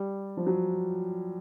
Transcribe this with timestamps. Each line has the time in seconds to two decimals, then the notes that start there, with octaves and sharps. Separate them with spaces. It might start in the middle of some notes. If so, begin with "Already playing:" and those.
Already playing: G3
0.37 F3
0.47 F#3